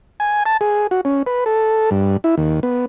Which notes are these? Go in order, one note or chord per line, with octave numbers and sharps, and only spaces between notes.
G#5
A5
G#4
F#4
C#4
B4
A4
G2
E4
D#2
B3